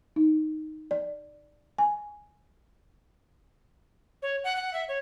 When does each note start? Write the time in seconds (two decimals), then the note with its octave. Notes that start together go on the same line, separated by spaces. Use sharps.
0.16 D#4
0.91 D5
1.78 G#5
4.22 C#5
4.44 F#5
4.56 F#5
4.74 E5
4.89 C#5